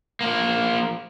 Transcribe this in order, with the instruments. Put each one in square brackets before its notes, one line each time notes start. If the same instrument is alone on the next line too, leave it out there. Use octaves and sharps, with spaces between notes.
[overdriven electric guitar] F3 A#3